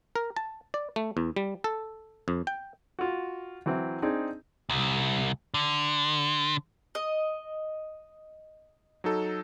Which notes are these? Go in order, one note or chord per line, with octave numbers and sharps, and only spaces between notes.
A#4
A5
D5
A3
E2
G3
A4
F2
G5
F4 F#4
E3 F#3 C4 E4
C4 D4 D#4 G#4
C2
D3
D#5
F#3 D#4 A4